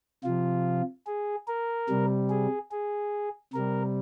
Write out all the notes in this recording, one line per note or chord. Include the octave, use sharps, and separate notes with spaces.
C3 F3 F4
G#4
A#4
C3 G3
G#4
G#4
C3 G3 A#4